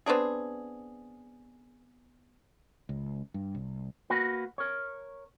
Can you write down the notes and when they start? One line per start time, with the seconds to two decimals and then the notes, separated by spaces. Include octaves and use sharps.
0.06 B3 C4 D4 G#4
2.89 C#2
3.34 G2
3.55 C2
4.10 A#3 F#4 B4
4.58 A#4 C#5